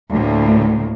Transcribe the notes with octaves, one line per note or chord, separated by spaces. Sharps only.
D2 A2 A#3